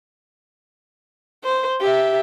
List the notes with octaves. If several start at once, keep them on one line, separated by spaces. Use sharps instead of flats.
C5
G4 E5